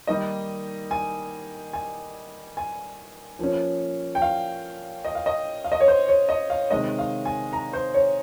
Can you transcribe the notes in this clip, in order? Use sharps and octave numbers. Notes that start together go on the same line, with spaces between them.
D#3 G3 A#3 D#4 D#5
G#5
G#5
G#5
F3 A#3 C#4
G5
F5
D#5
F5
D#5
F5
D#5
C#5
C5
C#5
D#5
F5
C3 D#3 G#3 D#5
F5
G#5
A#5
C5
C#5